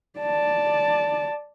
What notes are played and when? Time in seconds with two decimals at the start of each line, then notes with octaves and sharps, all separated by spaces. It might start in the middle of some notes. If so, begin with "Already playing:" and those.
0.20 D5 A5